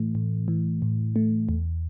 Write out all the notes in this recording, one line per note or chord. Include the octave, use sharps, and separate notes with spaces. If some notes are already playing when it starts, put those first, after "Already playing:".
Already playing: A2 E3 A3
A2
E3
A2
A3
E2